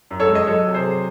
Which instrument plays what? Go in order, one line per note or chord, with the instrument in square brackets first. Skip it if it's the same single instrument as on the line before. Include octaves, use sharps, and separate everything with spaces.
[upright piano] F#2
A4 C#5
G#3
D#5
F#3 A4 C#5
C3
G#4 C5
F#3